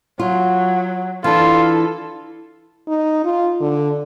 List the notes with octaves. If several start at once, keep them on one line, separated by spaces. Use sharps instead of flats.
F#3 F4
E3 D4 F4 A4
D#4
F4
D3